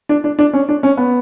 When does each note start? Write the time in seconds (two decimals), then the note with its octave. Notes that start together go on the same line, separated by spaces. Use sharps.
0.09 D4
0.24 D4
0.39 D4
0.53 C#4
0.69 D4
0.83 C#4
0.97 B3